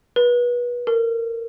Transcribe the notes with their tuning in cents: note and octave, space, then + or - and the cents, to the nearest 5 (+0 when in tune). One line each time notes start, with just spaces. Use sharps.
B4 -30
A#4 -25